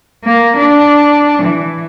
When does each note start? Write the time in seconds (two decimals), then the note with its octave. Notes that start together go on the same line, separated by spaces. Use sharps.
0.24 A#3
0.57 D4
1.43 E3